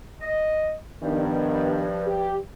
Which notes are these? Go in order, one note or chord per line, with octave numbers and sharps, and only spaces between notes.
D#5
G2 D#3 F3 B3 D4
G4